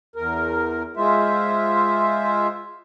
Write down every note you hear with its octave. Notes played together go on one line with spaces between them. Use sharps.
E2 A#4
G#3 F4 C5 E5